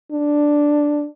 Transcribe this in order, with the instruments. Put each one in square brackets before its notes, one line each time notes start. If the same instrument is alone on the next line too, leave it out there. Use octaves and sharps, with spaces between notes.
[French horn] D4